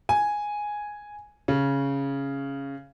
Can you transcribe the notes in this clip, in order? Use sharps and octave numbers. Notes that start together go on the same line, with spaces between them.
G#5
C#3